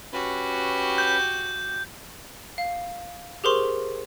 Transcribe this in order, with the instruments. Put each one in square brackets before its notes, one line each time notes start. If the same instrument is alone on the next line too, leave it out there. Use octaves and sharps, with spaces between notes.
[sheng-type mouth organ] C#4 B4 [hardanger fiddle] F#4 G4
[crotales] G6
[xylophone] F5
G4 G#4 A#4 C5 C6 C#6